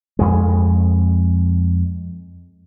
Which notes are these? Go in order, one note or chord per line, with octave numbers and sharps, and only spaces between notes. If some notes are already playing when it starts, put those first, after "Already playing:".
F2 G#3